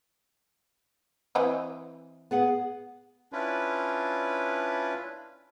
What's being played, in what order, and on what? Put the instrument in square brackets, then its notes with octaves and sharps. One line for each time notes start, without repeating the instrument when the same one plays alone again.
[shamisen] E3 C4 D#5
[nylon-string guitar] B3 G#4 F#5
[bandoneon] C#4 D4 E4 F4 B4